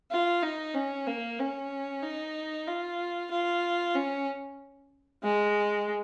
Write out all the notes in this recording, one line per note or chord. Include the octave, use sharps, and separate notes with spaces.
F4
D#4
C#4
A#3
C#4
D#4
F4
F4
C#4
G#3